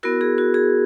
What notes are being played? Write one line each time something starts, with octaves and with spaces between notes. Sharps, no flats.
B3 E4 F#4 A#4
G#4
F#4
G#4